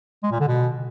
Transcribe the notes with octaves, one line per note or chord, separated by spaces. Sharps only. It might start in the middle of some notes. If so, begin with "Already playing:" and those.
G#3
A#2
D3
B2